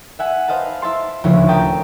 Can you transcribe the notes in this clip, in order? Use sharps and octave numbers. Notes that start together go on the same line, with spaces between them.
E5 F#5 G#5
B4 C5 D#5 F5 A5
E4 E5 A5 C6
D#1 D2 C#3 F3 E4 C#5
G4 A#4 G5 A5 A#5 D#6